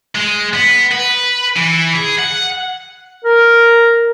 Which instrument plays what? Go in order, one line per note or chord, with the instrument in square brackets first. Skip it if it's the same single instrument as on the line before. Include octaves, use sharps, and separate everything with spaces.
[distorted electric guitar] G#3
B3
B4
E3
G#4
F#5
[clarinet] A#4